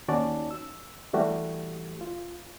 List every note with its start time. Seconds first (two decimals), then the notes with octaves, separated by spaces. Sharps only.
0.08 D#2 C#4 D#4 F#4 D5 A5
0.51 E6
1.13 E3 G3 A3 F#4 G4
2.01 F4